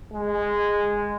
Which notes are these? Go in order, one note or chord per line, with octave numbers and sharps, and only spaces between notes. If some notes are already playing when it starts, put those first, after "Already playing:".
G#3